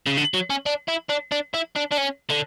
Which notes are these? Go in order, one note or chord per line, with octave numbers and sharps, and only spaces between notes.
C#3
D3
F#3
C#4
D4
E4
D4
D4
E4
D4
D4
C#4
D3